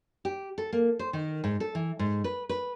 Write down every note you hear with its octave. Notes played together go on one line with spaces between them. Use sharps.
G4
A4
A#3
C5
D#3
G#2
A4
E3
G#2
B4
B4